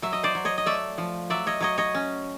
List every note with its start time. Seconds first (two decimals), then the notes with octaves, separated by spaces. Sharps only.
0.02 F#3 E5
0.13 D#5
0.23 C5 D5
0.35 F#3
0.45 C#5 D#5
0.58 D#5
0.66 A3 D5 E5
0.98 F3
1.30 F#3 D5 E5
1.47 C#5 D#5
1.60 F#3 C#5 D#5
1.78 C#5 D#5
1.95 C#4